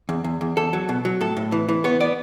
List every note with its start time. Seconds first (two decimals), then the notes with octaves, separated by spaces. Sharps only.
0.09 E2
0.24 E2
0.41 E2
0.57 E2 A4
0.73 F#3
0.89 B2
1.05 F#3
1.21 A2 A4
1.37 A2
1.52 E3
1.69 E3
1.84 B3 C#5
2.00 B3 D5